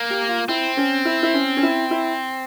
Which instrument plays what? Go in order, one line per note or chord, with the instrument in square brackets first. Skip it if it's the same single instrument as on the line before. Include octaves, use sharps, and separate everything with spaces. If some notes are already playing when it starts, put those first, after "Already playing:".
Already playing: [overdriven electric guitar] A#3
[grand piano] G4
F4
[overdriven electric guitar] C4 [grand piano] E4
[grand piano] C#4
E4
E4
C#4
C#4
E4
E4